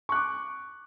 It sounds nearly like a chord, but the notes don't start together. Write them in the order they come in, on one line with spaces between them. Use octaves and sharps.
C#6 F#6 D6